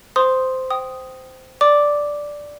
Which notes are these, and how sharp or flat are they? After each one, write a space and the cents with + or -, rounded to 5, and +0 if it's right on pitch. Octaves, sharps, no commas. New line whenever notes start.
C5 -15 C6 +0 D#6 +0
G5 -15 D#6 +0
D5 +0 D6 +0